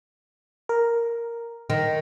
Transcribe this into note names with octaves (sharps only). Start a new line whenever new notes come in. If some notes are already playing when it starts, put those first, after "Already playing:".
A#4
D#3